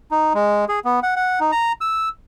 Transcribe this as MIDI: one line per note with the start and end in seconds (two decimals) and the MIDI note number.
0.11 0.33 63
0.34 0.65 56
0.69 0.79 68
0.85 1.00 59
1.03 1.14 78
1.16 1.40 78
1.40 1.52 63
1.52 1.72 82
1.81 2.09 88